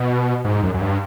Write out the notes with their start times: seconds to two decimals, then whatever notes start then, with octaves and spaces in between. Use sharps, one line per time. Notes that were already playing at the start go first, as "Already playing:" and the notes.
Already playing: B2
0.45 G#2
0.63 F#2
0.74 F#2
0.81 G2